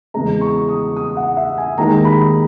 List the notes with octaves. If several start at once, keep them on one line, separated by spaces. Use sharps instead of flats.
E2 C#3 G#3 A#5
C#6
D#6
D#6
F#5
E5
G#5
D#2 D#3 G#3 A#5
B5